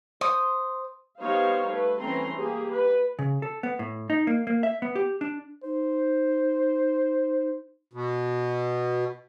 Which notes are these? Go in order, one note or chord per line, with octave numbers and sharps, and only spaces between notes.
C5 D#6
G3 B3 D#4 C5 C#5 F5
A3 B4
E3 A3 C4 C#4 A#5 C6
A#3 G4 G#4
B4
C#3
A4
B3
A2
D#4
A#3
A#3
E5
B3
G4
D4
D#4 C5
B2